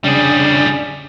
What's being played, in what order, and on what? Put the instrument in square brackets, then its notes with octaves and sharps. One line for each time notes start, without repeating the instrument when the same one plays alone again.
[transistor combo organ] C#3 D4 [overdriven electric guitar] G3 G#4